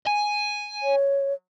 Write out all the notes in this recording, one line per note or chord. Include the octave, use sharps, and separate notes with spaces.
G#5
C#5